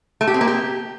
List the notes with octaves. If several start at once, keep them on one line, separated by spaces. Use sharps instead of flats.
A3
G4
C4
A#3
G4